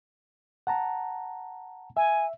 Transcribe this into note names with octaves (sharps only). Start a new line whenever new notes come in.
F#5 A5 A#5
E5 G#5